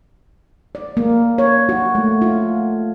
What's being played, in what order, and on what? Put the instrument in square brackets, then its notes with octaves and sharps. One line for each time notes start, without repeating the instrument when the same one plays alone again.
[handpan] D5
A#3
C#5
F#4
A3
F4